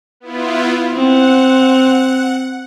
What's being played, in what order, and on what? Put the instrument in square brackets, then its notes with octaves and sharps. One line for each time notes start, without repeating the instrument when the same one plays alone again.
[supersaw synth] B3 E4 F4
[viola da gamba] C4 [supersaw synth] F#5